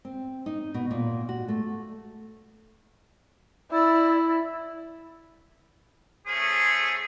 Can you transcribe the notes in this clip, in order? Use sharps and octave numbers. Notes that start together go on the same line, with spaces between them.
C4
D#4
B2
A#2
F#4
A3
E4 D5 E6
A3 C#4 G#4 C5